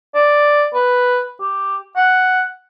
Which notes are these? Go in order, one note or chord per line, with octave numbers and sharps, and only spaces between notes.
D5
B4
G4
F#5